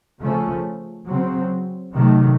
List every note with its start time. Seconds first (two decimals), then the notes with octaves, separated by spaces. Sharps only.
0.22 C#3 F3 A3 C#4
1.09 C#3 F#3 C4
1.95 C3 D#3 F#3 A3